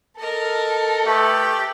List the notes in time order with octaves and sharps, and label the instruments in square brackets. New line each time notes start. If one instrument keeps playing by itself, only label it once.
[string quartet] A4 [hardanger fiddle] A#4 D#5
[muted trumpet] A3 [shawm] G4 [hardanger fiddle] B4